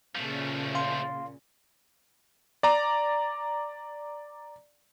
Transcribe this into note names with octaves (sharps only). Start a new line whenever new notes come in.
A#2 C#3 F3 A3
F5 C6
D5 A#5